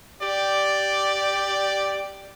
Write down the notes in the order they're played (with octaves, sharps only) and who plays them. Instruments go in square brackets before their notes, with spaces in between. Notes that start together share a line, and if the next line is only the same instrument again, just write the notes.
[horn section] G4 D5